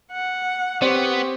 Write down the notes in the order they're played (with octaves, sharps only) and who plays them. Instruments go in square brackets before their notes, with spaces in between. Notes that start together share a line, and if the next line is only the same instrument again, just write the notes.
[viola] F#5
[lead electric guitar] B3 [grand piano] C4 C5 [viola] G4 C#5